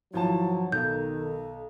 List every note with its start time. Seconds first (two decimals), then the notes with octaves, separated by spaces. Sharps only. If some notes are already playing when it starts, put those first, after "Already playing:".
0.14 G#1 F3 F#3 E4 A5
0.72 B1 D#3 A4 G6